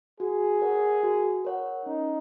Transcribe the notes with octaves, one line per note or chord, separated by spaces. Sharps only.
F#4 G#4
A#4 C#5 F#5
F#4
A#4 C#5 F#5
C#4 D#4